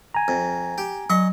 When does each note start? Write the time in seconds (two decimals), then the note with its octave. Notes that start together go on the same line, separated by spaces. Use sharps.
0.14 G#5 A#5
0.28 F2
0.78 G4
1.10 F#3 D#5 C#6